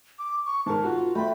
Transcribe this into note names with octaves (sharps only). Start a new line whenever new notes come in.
D6
C#6
G#2 A#4 A5
F4 F#4
A3 G5 B5 C6